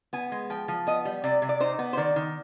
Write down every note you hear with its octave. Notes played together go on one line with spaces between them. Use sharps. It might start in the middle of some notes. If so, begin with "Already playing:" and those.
B3 G#5
G#3
F3 G5
F3
B3 D#5
G3
C3 D5
C3
D5
D#4 C5
B3
C5
D#3 D5
D#3